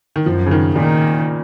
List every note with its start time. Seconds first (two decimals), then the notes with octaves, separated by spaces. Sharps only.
0.16 D#3
0.26 F#2 F3
0.46 C#3
0.51 D#3
0.76 A#2 D#3